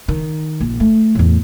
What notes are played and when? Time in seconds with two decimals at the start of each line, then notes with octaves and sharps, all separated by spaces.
0.08 D#3
0.60 A#1
0.80 A3
1.15 E2 A2